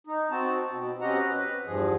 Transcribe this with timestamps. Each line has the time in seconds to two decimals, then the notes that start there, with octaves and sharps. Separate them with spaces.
0.07 D#4
0.31 C4 F#4 A5
0.71 B2
1.01 C4 C#4 G4 D#5 F#5 A#5
1.18 B4
1.66 E2 G2 F3 G#4